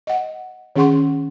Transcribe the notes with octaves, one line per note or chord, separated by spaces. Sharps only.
D#5 F#5
D#3 C#4 G#4 F#5 C6 C#6